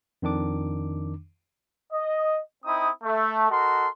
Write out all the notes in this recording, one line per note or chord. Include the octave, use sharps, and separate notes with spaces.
F2 D#3 D4 D6
D#5
C4 D#4 E4 D#6
A3
F#4 A4 A#4 D#5 C6